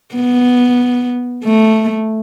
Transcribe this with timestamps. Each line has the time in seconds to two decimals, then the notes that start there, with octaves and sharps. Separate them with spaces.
0.15 B3
1.44 A3